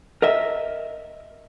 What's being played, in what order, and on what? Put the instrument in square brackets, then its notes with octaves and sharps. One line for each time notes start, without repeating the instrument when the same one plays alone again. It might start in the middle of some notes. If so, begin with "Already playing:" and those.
[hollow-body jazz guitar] A#4 D#5 E5